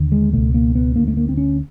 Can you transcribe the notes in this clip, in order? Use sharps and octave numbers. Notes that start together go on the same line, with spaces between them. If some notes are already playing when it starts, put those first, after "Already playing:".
Already playing: D#2 D3
G#3
C#2 B2 A3
A#3
B3
D2 D3 A#3
A3
A#3
C4
C#4